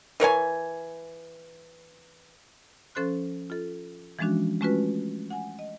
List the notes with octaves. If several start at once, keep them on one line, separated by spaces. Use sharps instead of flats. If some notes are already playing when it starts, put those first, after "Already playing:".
E3 A#4 C#5 G#5
F3 C#4 A4 C5 C6 F#6
F4 A4
E3 F3 G#3 C#4 D4 F#4
G#3 A3 C#4 F4 F#4 B4
F#5 G#5
D#5